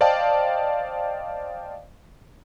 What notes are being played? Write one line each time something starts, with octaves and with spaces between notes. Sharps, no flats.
C5 D5 D#5 F5 G5 A5